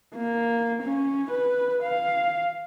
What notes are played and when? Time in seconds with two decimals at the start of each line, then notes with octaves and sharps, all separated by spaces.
0.15 A#3
0.83 C#4
1.31 B4
1.83 F5